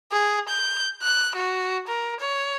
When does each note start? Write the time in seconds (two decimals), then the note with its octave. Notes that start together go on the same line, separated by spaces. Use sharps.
0.12 G#4
0.49 G6
1.03 F#6
1.36 F#4
1.88 A#4
2.20 C#5